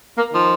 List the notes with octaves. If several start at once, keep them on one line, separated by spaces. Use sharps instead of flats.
A#3
D#3 F3